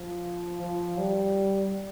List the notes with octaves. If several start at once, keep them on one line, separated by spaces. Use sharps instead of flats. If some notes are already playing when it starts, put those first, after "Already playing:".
Already playing: F3
F3
G3